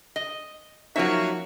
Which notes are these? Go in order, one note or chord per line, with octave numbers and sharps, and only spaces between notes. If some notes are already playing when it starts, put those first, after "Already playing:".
D#5
F3 F#3 A#3 C#4 D#4 F#4 C#5 E5